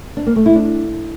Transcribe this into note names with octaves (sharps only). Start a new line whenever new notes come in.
D4
A#3
A3
E4
D4